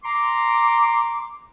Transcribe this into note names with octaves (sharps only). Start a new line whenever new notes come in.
A#5 C6 D6